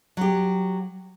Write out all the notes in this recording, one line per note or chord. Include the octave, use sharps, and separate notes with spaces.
F#3 G4